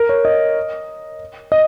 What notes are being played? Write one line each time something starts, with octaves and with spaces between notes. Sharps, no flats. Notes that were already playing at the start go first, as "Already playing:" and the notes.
Already playing: A#4
C#5
D#5
D#5